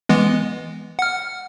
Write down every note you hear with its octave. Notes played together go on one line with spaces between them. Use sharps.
E3 G#3 B3
F#5 F6